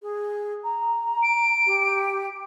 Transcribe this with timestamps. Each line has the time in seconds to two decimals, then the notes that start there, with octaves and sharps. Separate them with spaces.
0.02 G#4
0.64 A#5
1.23 D7
1.66 G4